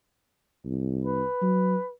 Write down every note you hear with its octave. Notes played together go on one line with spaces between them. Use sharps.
C2
B4
F#3